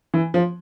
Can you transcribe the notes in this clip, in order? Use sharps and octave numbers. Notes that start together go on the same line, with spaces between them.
E3
F3